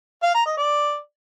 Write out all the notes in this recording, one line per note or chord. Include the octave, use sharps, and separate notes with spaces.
F5
A#5
D#5
D5